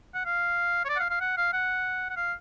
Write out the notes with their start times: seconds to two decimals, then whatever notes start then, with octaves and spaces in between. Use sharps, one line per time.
0.14 F#5
0.25 F5
0.85 C#5
0.89 D5
0.96 F#5
0.99 F5
1.10 F5
1.21 F#5
1.37 F5
1.53 F#5
2.10 F#5
2.16 F5